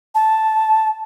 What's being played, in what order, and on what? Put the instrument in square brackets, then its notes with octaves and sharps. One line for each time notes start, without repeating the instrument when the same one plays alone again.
[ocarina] A5